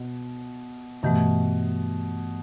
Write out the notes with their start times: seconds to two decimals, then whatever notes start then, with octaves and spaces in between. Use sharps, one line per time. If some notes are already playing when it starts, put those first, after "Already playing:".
Already playing: B2
1.03 G2 B2 E3 A3